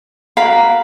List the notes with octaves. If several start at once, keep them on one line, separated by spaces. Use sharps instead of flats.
F#4 A#4 F5 B5